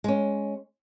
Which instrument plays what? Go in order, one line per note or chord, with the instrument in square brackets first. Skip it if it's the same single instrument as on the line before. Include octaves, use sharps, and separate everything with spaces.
[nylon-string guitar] G#3 C#4